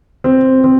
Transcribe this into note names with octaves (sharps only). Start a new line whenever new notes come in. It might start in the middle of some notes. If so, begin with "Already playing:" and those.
C4
C4